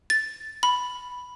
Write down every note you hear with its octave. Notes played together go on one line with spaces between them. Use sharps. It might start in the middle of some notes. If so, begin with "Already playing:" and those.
A6
B5